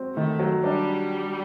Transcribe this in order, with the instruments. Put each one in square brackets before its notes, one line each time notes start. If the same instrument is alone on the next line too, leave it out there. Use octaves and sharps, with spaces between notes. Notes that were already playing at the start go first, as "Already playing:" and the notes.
Already playing: [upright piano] F#3 C4 F#4
[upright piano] D#3 [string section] A3
[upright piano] F#3
[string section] G3 [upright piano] D4